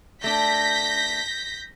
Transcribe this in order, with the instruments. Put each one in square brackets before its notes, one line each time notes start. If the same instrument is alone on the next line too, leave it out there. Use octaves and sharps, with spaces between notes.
[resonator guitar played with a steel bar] A3 D4 [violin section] G6 A#6 B6